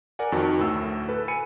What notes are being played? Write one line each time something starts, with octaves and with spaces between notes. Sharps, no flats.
A#4 D5 F#5 G#5
F2 D#3 F#4 A5
D2 A2 E6
A4 B4
G#5 B5 C#7 D#7